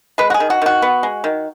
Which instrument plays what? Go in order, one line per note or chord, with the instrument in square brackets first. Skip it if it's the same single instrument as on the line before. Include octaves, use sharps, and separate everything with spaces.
[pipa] G#3 B4
F#4
G#4
D#3
F#4
D#3 F#4
B3
G#3
D#3